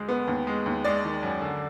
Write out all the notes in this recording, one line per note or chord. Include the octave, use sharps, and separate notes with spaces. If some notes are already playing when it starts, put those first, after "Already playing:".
Already playing: D2 G#3
B3
D#2
G#3
D#2
G#3 D5
D#3
F#2
D3